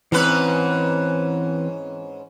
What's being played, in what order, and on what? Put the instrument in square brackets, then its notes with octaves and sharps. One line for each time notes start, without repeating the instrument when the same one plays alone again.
[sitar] G#2 C#4 B4 [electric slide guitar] E3 C4